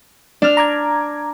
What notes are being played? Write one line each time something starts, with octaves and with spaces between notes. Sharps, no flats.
D4 F6
A#5 D6 G#6